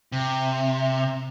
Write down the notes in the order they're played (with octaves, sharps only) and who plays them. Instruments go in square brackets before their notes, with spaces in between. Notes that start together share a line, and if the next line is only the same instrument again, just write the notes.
[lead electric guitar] C3